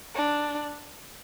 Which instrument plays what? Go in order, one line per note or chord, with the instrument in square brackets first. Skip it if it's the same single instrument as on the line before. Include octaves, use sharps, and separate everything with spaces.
[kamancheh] D4